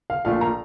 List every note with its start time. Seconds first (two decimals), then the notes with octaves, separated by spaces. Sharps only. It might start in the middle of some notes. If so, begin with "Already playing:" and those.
0.10 F5
0.25 A#1 A#2 A3 F5
0.41 A#5